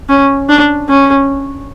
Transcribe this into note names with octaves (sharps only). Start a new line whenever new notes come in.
C#4
D4
C#4